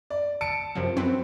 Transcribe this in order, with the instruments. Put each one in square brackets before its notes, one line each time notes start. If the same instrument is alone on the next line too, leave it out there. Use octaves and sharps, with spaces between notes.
[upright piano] D5
A5 C#7 D7
[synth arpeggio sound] F#2 C3 F3
F#2 C4 B4